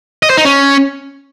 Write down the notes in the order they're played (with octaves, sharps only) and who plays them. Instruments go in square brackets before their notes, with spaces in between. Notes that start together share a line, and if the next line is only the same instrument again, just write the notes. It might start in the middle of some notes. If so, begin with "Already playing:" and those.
[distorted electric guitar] D#5
C5
D#4
C#4